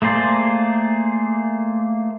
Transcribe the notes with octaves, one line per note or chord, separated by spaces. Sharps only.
A3 A#3 G#4 C5 D5